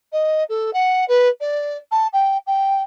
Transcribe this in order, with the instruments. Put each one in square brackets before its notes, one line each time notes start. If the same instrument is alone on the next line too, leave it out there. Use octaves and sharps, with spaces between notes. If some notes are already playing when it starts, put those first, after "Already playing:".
[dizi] D#5
A4
F#5
B4
D5
A5
G5
G5